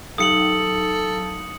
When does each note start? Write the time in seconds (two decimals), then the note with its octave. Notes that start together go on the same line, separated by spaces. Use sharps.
0.18 F#3 D#4 A4 F5 D#6 C#7 F#7